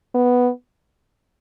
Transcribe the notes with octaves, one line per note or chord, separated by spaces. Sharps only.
B3